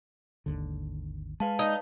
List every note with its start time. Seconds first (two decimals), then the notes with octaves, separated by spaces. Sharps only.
0.46 G#1 D#2 D3
1.40 G#3 B4 F5 A5
1.59 D#4